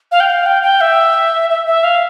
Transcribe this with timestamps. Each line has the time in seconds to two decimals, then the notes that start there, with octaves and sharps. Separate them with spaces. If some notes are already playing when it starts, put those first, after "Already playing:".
0.12 F5
0.20 G5
0.30 F5
0.46 G5
0.63 G5
0.81 E5
1.50 E5
1.66 E5
1.84 F5